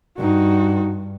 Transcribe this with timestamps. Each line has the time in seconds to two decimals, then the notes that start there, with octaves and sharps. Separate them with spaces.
0.18 G2 D#4 F#4